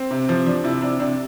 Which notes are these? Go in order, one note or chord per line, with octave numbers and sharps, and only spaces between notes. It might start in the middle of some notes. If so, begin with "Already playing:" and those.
Already playing: C4
C3
F3
F3 D4
C3 E4
C3 D4
C3 D4